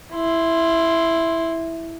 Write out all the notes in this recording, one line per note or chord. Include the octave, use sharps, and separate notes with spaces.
E4 C6